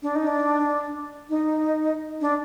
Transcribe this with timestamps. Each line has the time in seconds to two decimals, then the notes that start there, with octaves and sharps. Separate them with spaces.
0.03 D4
0.15 D#4
0.27 D4
1.29 D#4
2.21 D4